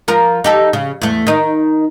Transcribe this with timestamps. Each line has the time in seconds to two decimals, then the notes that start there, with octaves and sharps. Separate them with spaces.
0.08 F3 A#4
0.44 D#4 G4 A4
0.73 C#3
1.01 E2 A3
1.27 D#3 D#4